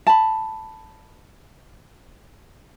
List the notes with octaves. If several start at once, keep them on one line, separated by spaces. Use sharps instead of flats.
A5 B5